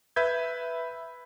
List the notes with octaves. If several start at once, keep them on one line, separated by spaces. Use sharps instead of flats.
B4 E5 G6 G#6